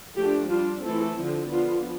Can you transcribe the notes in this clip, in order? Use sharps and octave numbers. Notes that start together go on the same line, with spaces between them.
F3 A3 D4 G4
G3 D4 F4
E3 A3 C4 E4 A4
D3 F3 C4
F3 B3 D4 F4